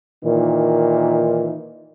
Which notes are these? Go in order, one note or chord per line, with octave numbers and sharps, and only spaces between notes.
A#2 D#3 E3 D#4